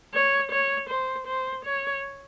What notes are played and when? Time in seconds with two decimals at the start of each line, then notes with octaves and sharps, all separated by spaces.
0.14 C#5
0.51 C#5
0.90 C5
1.26 C5
1.65 C#5